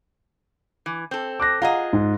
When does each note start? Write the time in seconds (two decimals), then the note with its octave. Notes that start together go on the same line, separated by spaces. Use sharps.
0.86 E3
1.11 C4 A4
1.40 D6 F#6 A#6
1.62 F4 G#4 D#5 F#5 A#5
1.93 G#2